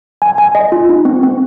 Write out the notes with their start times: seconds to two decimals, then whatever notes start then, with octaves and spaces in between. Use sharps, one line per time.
0.22 G#5
0.38 G#5
0.55 D#5
0.72 F4
0.89 D#4
1.05 C4
1.23 C4